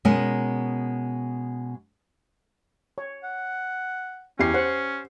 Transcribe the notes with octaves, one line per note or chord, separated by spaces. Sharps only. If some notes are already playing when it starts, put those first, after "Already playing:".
B2 G#3 C#4 A#4
C#5
F#5
E2 C#4 E4 G4 C7
C5 F#5